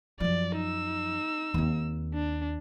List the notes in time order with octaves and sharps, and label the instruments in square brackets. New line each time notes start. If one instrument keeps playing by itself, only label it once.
[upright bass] F#2 F3 [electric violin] D5
[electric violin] D#4 E6
[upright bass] D#2 C4
[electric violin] D4